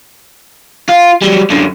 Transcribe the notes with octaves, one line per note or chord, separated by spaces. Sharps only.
F4
F#3 G3
F#2 D3